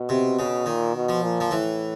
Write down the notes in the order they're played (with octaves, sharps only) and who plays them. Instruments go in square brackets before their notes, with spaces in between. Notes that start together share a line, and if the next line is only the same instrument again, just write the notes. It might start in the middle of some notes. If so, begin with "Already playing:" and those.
Already playing: [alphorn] B2
[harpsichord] C3
C#3
[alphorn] A#2 [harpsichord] D#3
[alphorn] B2
[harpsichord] F3
[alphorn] A#2
[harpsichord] F3
[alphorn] A2 [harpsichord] E3